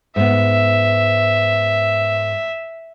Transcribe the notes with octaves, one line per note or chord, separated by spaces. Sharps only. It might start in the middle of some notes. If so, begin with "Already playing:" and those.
G#2 B3 E5